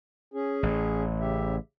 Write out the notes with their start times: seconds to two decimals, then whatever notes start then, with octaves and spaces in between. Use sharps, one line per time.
0.34 C#4 G#4
0.63 A1
1.20 C#3 G4 E5